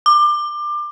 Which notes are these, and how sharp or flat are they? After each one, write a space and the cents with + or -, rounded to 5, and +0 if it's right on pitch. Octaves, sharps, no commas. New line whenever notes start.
D6 +25